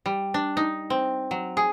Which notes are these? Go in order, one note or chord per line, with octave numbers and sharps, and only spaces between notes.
G3
D4
D#4
C4
F#3
G#4